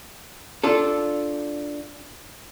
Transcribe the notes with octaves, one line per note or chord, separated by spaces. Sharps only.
D4 F4 A4